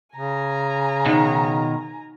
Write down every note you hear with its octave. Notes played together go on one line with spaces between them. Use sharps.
C#3 G#5 A#5
B2 D#3 D#4 C5 D#5